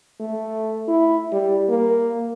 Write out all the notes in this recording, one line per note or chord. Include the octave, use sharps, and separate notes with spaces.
A3
E4
G3
A#3